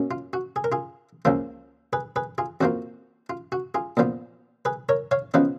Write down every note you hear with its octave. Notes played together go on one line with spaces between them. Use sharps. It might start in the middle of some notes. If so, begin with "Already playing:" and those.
Already playing: B2 A#3 C#4
F4
F#4
G#4
A#4
F4 G#4
C#2 C#3 F3 A#3 F4
G#4 B4
G#4 B4
F4 G#4
F2 F3 A#3 F4 F#4
F4
F#4
F4 G#4
A#2 F3 B3 F4
G#4 B4
A#4 C#5
C#5 F5
C#3 F3 B3 F4 B4 D#5